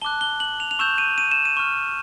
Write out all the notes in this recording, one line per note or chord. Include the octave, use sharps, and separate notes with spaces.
A5 D6 F#6 G7
G7
F#7
F7
F7
C#6 E6 G6 E7
D#7
D#7
E7
D#7
C#6 F6